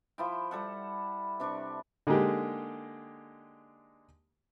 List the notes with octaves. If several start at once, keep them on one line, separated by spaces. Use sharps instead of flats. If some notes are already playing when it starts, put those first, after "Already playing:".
F3 E4 G5
G3 A4 F#5
C3 D4 B4 C#6
D3 G#3 A#3 D#4 G4